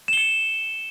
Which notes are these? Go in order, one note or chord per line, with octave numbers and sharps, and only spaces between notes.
C#7 E7 G7